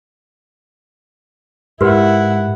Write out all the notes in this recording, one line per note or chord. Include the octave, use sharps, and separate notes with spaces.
G#2 E4 G4 A#4 B4 F#5